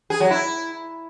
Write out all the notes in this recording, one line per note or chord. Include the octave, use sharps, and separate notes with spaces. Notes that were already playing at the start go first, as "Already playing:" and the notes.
G#4
F#3
E4